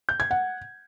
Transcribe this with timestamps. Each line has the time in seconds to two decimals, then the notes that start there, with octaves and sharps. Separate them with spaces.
0.09 G6
0.20 G#6
0.31 F#5